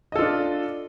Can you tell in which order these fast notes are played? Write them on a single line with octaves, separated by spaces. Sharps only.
D#5 A4 F4 D4